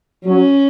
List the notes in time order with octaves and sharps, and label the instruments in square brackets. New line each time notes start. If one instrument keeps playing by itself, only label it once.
[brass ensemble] F#3 [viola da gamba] C#4